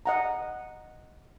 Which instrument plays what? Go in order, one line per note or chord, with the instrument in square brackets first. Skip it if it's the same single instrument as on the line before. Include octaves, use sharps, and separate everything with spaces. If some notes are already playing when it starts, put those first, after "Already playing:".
[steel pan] D#5 F#5 A#5